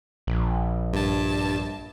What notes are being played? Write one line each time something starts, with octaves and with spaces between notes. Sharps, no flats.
A#1
G2 A5